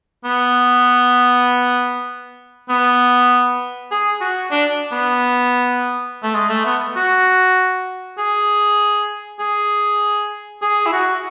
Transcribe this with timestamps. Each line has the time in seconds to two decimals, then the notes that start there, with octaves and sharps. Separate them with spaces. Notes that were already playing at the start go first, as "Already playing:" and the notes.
0.25 B3
2.69 B3
3.91 G#4
4.21 F#4
4.51 D4
4.92 B3
6.23 A3
6.34 G#3
6.49 A3
6.65 B3
6.96 F#4
8.18 G#4
9.39 G#4
10.62 G#4
10.86 E4
10.92 F#4